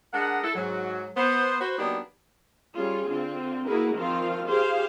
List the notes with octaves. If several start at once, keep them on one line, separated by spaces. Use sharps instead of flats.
G#3 D4 A#4 D#5 F#5
E4 A4
G#2 F#3
B3 C5
F#4 B4 C5
F#3 A#3 B3 D4 D#4 G4
G3 C#4 F4 G#4
D3 C4 F4
A#3 E4 F#4 G#4 A#4 B4
D#3 F3 C4 F4 F5
F4 G4 G#4 C5 F5